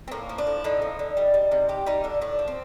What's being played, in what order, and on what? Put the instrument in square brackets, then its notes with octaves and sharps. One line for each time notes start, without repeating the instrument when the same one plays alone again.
[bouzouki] C4
A2 A#3
F3
D4
A2
D3 D#4
F3
D3
G3
G3
C3
G3 G4
G3 D#4
D3 D4
A2 D4
F3
C4